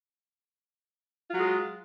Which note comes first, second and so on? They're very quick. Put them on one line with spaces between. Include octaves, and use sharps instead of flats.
F4 F#3 G#3